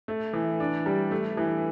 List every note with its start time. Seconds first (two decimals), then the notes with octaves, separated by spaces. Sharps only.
0.08 A3
0.33 E3
0.60 D4
0.86 G3
1.11 A3
1.37 E3